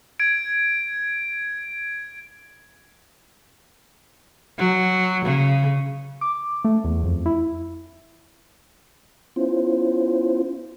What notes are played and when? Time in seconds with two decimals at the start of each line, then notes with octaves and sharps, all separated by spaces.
0.20 G#6 D7
4.59 F#3
5.25 C#3
6.21 D6
6.65 A3
6.84 E2
7.04 F2
7.26 E4
9.36 B3 C#4 E4 F4 C5